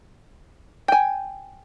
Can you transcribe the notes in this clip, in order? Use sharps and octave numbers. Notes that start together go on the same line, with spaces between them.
G5 G#5